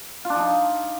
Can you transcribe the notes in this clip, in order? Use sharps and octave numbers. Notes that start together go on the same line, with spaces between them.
F4
D4
F3
D#4